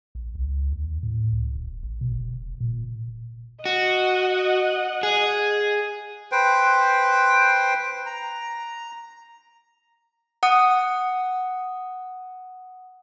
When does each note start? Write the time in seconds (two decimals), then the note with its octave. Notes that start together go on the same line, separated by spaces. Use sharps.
0.15 A#1
0.35 C#2
0.73 D#2
1.03 A2
1.32 C#2
1.56 D1
1.83 A1
2.01 B2
2.14 E1
2.34 E1
2.60 A#2
3.66 F#4 D#5 F#5
5.03 G#4
6.32 B4 C5 G5
8.06 A#5
10.43 F#5 D#6